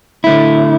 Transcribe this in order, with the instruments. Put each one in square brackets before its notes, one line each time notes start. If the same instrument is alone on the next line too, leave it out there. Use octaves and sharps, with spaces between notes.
[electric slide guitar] D3 A3 E4